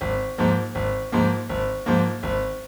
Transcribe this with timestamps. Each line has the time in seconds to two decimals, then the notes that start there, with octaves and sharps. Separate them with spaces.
0.01 G#1
0.38 G#2 F3 A#3
0.75 G#1
1.12 G#2 F3 A#3
1.49 G#1
1.86 G#2 F3 A#3
2.23 G#1